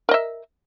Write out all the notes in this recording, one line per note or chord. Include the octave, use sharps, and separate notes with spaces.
A#4 D#5 E5